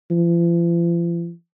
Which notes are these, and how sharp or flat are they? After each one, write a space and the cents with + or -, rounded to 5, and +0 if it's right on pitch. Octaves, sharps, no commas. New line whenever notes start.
F3 -45